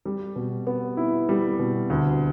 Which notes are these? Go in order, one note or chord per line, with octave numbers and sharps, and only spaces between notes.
G3
B2
B3
E4
G3
B2
D2